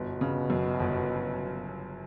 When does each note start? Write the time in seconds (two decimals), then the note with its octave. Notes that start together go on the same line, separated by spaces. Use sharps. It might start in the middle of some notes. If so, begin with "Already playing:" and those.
Already playing: G1 B2
0.21 C#3
0.50 F#2
0.80 G1